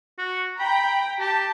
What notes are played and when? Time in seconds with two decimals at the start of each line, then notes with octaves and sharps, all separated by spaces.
0.19 F#4
0.60 G5 A#5 B5
1.20 G4 A5